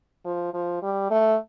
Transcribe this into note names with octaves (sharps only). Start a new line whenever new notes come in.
F3
F3
G3
A3